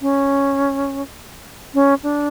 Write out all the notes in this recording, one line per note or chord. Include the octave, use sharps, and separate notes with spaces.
C#4
C#4
D4